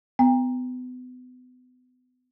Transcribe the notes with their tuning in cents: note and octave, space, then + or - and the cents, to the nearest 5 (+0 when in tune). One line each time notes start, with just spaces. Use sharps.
B3 +35 G5 +30